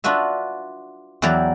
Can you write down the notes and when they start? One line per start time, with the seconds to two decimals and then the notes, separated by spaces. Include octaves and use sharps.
0.04 D4 F4 F#4 B4 E5
1.22 E2 F#3 E4 D5 G5 A#5